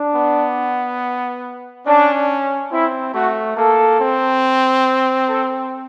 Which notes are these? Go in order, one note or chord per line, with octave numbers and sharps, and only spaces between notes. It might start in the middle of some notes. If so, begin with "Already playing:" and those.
Already playing: D4
B3
C#4 D4
C4 E4
A3 F#4
A#3 A4
C4
A4